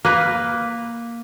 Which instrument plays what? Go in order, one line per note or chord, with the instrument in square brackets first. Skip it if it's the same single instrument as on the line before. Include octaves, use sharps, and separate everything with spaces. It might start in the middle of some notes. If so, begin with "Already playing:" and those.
[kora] A#3 B4